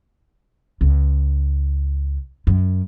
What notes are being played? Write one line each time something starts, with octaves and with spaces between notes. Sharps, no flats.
C#2
F#2